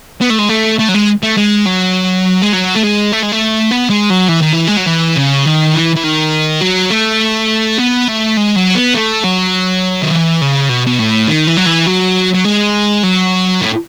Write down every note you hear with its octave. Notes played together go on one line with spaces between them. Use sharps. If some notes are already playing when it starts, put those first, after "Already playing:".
B3
A3
G#3
A3
A3
F#3
G#3
A3
G#3
F#3
G#3
F#3
A3
G#3
A3
G#3
A3
B3
G#3
F#3
E3
D#3
E3
G#3
F#3
E3
C#3
D#3
E3
E3
D#3
F#3
A3
B3
A3
G#3
F#3
B3
A3
F#3
D#3
E3
C#3
B2
B2
A2
D#3
E3
F#3
E3
F#3
F#3
G#3
F#3
A2